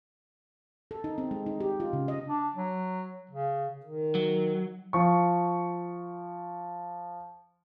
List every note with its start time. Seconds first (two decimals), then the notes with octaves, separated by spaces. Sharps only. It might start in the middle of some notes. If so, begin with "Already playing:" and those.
0.91 A4
1.04 D#4
1.18 C4
1.31 G#3
1.46 D#4
1.60 G4
1.80 F4
1.93 C#3
2.08 D#5
2.27 D4
2.55 F#3
3.31 C#3
3.82 D#3
4.15 F#3
4.93 F3 C#6